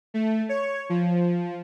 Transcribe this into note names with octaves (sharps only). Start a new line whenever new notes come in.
A3
C#5
F3